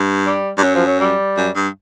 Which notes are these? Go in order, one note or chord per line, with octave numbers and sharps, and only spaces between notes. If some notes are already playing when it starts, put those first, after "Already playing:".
Already playing: G2
G3
G2 G3
F#2 F#3
F3
F#3
G3
F#2
G2